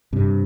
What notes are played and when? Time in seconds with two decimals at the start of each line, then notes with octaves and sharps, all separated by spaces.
0.13 G2 C3